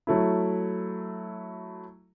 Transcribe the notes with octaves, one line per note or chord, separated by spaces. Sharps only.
F#3 A3 E4